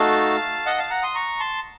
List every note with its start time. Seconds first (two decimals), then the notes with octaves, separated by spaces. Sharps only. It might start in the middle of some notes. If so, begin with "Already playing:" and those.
Already playing: A3 D#4 F#4 A4 F5 A5
0.66 D#5 F#5
0.78 F5 A5
0.90 F#5 A#5
1.03 C6 D#6
1.15 A#5 C#6
1.40 A5 C6